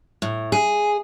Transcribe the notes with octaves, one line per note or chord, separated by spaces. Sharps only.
A2
G#4